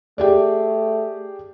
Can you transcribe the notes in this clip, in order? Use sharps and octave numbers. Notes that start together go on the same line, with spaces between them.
A3 G4 G#4 D5